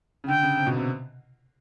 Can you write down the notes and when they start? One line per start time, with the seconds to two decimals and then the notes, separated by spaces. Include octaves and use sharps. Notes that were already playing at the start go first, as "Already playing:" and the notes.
0.24 C#3
0.28 D3 G5
0.43 C#3
0.57 C3
0.67 B2
0.76 C3